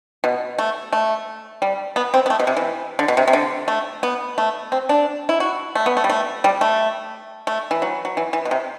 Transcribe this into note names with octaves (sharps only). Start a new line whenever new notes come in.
B2
A3
A3
G3
B3
C4
B3
A3
B2
C3
E3
D3
B2
C3
C3
D3
A3
B3
A3
C4
D4
E4
F#4
A3
B3
A3
G3
A3
G3
A3
A3
E3
F#3
F#3
E3
E3
B2
C3